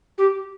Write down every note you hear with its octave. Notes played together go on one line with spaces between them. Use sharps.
G4